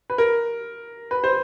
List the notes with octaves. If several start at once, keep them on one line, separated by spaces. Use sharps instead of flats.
B4
A#4
B4
C5